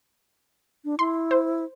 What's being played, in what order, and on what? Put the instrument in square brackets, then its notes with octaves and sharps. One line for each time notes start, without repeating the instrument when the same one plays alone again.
[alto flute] D4
[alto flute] E4 [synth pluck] C6
[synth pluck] C5